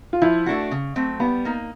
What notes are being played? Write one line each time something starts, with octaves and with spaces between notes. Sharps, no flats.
F4
F3 E4
A3 D4 F#4
C#3
F#3 A3 C4
G3 B3
A#3 D#4